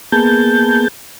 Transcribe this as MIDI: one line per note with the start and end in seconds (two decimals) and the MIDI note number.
0.12 0.88 58
0.12 0.88 59
0.12 0.88 68
0.12 0.88 81
0.12 0.88 91